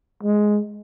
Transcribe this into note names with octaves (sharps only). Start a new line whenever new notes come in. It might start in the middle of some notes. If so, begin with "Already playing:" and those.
G#3